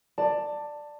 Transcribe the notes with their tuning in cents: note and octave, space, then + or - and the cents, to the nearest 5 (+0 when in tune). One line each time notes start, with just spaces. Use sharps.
D5 +10 A5 +15